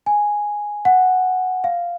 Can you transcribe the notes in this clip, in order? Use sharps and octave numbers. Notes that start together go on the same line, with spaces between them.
G#5
F#5
F5